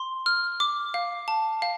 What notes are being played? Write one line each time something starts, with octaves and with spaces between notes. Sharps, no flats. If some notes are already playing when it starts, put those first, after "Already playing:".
Already playing: C6
F6
D6
F5
A5
F5